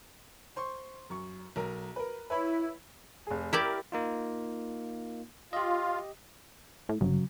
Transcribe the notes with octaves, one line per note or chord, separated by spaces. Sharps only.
C5 C6 C#6
F#2 C#6
B1 A#4 A#5
A#4 B4
E4 B4 C#5 B5
F1 G#4
E4 G4 A#4 D5
A#3 D#4 F4
F4 G4 D#5
A2
G1 C#3 F#3